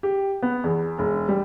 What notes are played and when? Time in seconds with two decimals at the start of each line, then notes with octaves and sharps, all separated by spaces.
0.03 G4
0.43 B3
0.64 E2
0.98 E1
1.29 G3